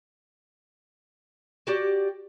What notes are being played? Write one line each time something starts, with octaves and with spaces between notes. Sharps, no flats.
F#4 G4 D5